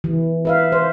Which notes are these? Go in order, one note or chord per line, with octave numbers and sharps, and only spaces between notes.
E3
B4 E5 F5
C5